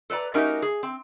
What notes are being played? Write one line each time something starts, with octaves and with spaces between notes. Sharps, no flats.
A4 B4 D5 A#5
A3 C#4 D#4 F#4 G4 A#4
G#4
C4